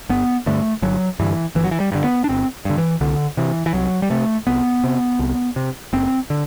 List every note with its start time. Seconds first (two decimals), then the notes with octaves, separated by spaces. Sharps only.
0.09 G1 B3
0.46 G2 D3 A3
0.82 G1 F#3
1.20 G2 D3 E3
1.55 G1 E3
1.64 F#3
1.71 E3
1.80 G3
1.92 G2 D3
2.04 B3
2.24 D4
2.29 G1 C4
2.65 G2 D3
2.78 E3
3.01 C2 D3
3.37 C3 E3
3.66 E3
3.74 C2 F#3
4.02 G3
4.10 C3 A3
4.47 C2 B3
4.84 C3
5.19 C2
5.56 C3
5.93 F#1 C4
6.30 D3